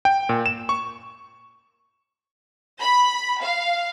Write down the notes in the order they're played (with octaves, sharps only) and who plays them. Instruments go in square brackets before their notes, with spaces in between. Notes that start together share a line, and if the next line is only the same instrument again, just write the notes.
[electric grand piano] G5
A#2
E7
C#6
[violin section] B5
F5